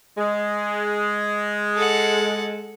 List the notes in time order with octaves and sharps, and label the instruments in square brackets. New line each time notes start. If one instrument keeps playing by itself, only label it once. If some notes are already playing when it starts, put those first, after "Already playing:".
[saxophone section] G#3
[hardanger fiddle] A4 F#5